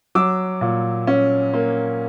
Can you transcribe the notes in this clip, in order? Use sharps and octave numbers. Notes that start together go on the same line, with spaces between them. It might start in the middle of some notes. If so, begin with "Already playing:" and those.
F#3 D6 E6
A#2
C#4
A#3